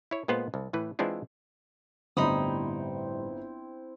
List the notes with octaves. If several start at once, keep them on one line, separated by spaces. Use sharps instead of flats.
E4 C#5
A#2 G#3 B3 F4 C5 F#5
C2
A2 E3 B4
E3 G#3 C4 D4 E4 F4
G1 A2 G3 C4 D#4 E4 B5 D#6